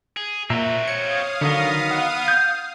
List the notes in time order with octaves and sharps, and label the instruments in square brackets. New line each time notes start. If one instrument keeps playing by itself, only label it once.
[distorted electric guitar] G#4
[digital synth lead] A#2 [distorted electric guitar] C4 F#4 [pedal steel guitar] E5 A#5 E6
[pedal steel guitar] C#5 [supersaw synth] F5 D#6 [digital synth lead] C#7
[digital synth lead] D3 [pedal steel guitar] D#3 F#3 D#4 [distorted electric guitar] B3
[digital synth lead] F#5
[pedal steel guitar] G6